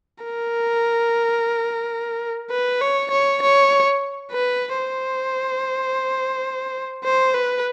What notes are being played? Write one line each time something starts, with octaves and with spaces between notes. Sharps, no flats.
A#4
B4
C#5
C#5
C#5
B4
C5
C5
B4